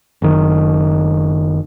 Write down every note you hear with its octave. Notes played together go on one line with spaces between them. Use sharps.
F#1 D#3